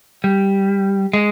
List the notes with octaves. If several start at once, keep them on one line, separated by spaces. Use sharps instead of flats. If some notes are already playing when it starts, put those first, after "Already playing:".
G3
G#3